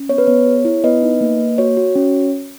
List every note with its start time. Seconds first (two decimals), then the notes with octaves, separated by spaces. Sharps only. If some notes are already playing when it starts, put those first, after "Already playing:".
Already playing: C#4
0.09 B3 C#5
0.18 B4
0.27 B3 C#5
0.46 G#4
0.65 E4
0.84 B3 B4 D#5
1.02 D#4
1.21 A#3
1.39 A#3
1.58 F#4 C#5
1.77 F#4
1.95 C#4